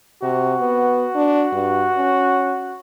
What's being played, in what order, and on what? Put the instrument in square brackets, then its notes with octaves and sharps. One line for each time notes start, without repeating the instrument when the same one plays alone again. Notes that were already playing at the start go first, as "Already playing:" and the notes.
[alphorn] C3 [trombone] F#4
[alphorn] B3
D4
G2
C#4